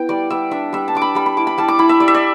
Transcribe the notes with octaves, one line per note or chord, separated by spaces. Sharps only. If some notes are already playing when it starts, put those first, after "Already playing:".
Already playing: B3 E4 G5
G3 D5
G3 E5
D4 E5
G3 E5
A5
D4 D6
B5
G3 B5
B5
E4 D6
B5
G3 A5
D6
E4 B5
E5
G3 D5
E5
D5